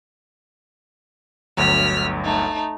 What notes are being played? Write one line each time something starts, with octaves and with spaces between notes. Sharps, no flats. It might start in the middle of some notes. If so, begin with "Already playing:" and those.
G1 D2 F#3 F6 B6
A3 D#4